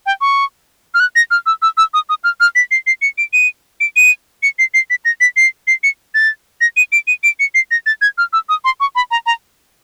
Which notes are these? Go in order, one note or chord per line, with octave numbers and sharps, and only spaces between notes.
G5
C#6
F6
F#6
A#6
F6
E6
E6
E6
D#6
D#6
F6
F6
B6
C7
C7
C#7
D7
D#7
D7
D#7
C#7
C7
C7
B6
A#6
B6
C7
C7
C#7
A6
A#6
D#7
D7
D#7
D7
C#7
C7
A#6
A6
G#6
F6
E6
D#6
C6
C#6
B5
A#5
A#5